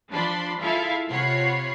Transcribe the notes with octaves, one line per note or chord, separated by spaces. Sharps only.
F3 D4 A5 B5 C6
E4 F4 G#4 A4 E5 F5
C3 F4 C#5 F#5 B5 C7